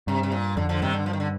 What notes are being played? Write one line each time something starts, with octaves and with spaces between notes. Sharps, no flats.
G2 C3
C3
A#2
F2 D3
D3 F3
G2 C3 D#3
D3
F3
D#3
D3